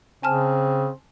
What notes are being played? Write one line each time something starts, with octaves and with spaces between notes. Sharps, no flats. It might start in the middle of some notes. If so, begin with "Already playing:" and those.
C#3 C4 G#5 A5 F6